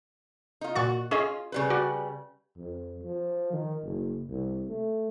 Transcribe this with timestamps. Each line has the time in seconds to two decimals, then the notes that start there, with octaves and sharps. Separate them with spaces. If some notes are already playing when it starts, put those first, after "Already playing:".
0.61 D#4 F4
0.75 A#2 F#4 C#6 A6
1.11 C#4 F4 G#4 D#5
1.52 C#3 G3 B4
1.70 F#4 D5
2.58 F2
3.03 F3
3.53 D#3
3.84 F#1
4.30 C2
4.68 A3